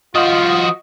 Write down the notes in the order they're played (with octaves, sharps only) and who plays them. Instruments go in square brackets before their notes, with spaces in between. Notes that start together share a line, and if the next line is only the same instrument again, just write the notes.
[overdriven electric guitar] F3 F#4 [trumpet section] F4 [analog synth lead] D#5